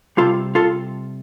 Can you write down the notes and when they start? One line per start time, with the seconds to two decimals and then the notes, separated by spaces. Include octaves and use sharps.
0.17 C3 G3 F4 A4
0.55 F4 A4